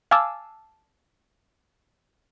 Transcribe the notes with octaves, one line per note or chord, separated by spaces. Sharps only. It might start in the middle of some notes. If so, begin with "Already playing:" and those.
F5 G#5 A5 D6 E6